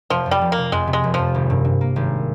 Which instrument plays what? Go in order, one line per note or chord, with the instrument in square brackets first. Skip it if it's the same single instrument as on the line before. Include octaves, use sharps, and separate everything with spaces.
[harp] F1 [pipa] F3
[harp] F2
[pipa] G3
[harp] F1
[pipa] A#3
[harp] C3
[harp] F2 [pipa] G#3
[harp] C3
[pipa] G#3
[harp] F1
[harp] F2 [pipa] F3
[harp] G#1
G2
G2
A#3
G#1